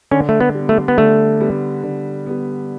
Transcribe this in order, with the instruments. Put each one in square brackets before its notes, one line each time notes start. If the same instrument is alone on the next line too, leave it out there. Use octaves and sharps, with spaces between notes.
[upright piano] D3 [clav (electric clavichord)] C#4
[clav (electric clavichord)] A3
B3
[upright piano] G3 B3
[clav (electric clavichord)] A3
B3
[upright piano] D3 [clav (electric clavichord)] A3
[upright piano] G3 B3
D3
G3 B3